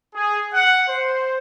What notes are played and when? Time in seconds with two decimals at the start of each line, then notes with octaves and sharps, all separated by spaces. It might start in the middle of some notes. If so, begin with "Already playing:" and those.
0.15 G#4
0.53 F#5
0.88 C5